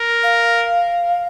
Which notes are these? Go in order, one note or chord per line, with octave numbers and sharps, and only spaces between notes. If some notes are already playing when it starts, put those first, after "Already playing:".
Already playing: A#4
F5